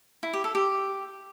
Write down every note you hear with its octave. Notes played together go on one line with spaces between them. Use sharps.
E4
G4
A4
G4